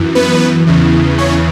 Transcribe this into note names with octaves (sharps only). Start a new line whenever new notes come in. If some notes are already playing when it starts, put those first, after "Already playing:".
Already playing: F#2 E3
B3 B4
E2 C#3 E3
C#4 C#5